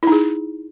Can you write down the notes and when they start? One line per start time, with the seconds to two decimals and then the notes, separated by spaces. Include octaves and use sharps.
0.03 E4
0.07 D#4
0.12 G#4